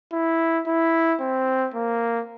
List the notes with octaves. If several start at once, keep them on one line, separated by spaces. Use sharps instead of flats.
E4
E4
C4
A#3